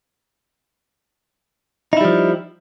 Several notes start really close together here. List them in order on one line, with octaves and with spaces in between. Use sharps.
D#4 E4 G3 F3